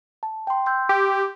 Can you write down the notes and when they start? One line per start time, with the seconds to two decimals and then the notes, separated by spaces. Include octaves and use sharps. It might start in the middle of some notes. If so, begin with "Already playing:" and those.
0.23 A5
0.47 G5 C6
0.66 C6 E6 G6
0.89 G4